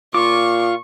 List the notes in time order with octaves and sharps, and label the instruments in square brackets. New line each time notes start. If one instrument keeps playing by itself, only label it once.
[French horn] A#2 [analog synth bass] F4 [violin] C#6 [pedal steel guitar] D6